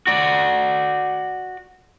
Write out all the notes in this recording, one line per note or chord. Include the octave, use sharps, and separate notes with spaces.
F#4 D5